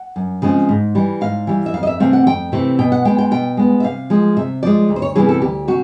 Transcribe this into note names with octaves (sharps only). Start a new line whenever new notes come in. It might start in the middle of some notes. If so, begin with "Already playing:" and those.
Already playing: F#5
F#2
C#3 F3 G#3 C4
G#2
E3 G3
G#2 F5
E3 G3
E5
F2 F5
D#5
E5
C3 E3 A3 C4 F5
F#5
F2 G5
C3 E3 A3 C4
B2 G5
F#5
G#3 B3 G5
G5
B2 G5
G#3 B3
E5
C3 F5
F3 G#3
C3 E5
F3 G#3 D5
D2
C5
C#5
C3 E3 G3 B3 G#4
A4
D2 G4
C3 F#4